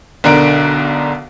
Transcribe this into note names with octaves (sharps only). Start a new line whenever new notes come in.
B1 D3 A#4 D7